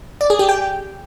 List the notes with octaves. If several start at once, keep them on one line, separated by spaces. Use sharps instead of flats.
D5
G#4
G4
G5